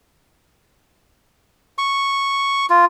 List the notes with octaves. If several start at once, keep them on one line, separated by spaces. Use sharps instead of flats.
C#6
F4